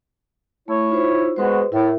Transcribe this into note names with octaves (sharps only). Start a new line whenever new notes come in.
A3 E4 C#5
D#4 F4 C5
G#3 B3 F#4 G#4 B4 C5
A2 E4 A#4 E5